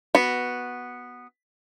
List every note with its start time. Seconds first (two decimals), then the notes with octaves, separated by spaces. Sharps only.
0.15 B3 F#4